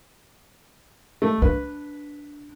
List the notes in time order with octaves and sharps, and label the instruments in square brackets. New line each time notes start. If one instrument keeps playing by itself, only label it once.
[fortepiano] A3
[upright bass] D4 [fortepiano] B4